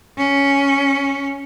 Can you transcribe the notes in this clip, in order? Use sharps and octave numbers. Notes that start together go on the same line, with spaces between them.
C#4